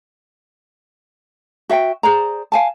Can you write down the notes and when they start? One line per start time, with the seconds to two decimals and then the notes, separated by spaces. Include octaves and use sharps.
1.69 F#4 E5 F5 G5
2.03 G#4 C5 D5 A#5
2.52 F5 G#5 A5